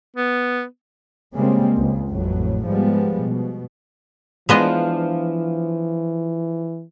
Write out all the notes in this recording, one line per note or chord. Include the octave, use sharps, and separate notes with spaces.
B3
C#3 G3 G#3 A#3 C4
C#2
A1 F2 A2 F#3
G#2 F3 G3 G#3 B3
B2
E3 F3 G#3 B3 D4 D#5